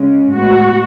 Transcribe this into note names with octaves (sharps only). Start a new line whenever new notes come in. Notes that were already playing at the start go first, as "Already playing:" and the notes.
Already playing: C#3 G#3 C#4
A2 G#3 B3 F#4